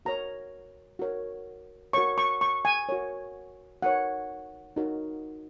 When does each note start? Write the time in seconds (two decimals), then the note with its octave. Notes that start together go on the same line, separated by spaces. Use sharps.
0.05 F#4 A#4 C#5 A#5
0.99 F#4 A#4 C#5
1.93 F#4 A#4 C#5 C#6
2.18 C#6
2.41 C#6
2.65 G#5
2.89 F#4 A#4 C#5
3.82 D#4 F#4 A#4 C#5 F#5
4.76 D#4 F#4 A#4 C#5